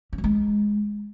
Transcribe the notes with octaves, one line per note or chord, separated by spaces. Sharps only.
C#4
F#3
G#3